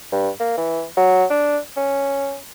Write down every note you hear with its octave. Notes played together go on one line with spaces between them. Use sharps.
G2
A#3
E3
F#3
D4
C#4